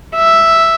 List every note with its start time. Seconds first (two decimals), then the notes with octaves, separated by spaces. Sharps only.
0.16 E5